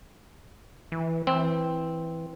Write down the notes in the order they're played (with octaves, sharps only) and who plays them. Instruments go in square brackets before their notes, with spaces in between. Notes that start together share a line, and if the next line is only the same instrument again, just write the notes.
[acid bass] E3
[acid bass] E3 [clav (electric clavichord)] C4